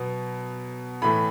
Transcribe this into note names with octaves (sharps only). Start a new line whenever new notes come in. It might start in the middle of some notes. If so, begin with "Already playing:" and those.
Already playing: B2 F#3 B3
A2 E3 A3 B5